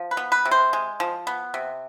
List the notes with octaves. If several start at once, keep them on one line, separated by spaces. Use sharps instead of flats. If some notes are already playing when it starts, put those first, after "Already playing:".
Already playing: F3
B4
B3
B4
C3
C5
G#3
F3
B3
C3